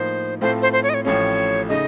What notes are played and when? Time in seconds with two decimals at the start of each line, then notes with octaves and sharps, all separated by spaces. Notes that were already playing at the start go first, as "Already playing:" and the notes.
Already playing: A2 F3 A#3 D#4 C5
0.41 A2 A3 C4 F4 A4 C5
0.62 C5
0.73 C5
0.83 C#5
0.89 D#5
0.94 C#5
1.05 A1 A2 F3 A3 C#4 C#5
1.68 C#3 A3 D#4 D#5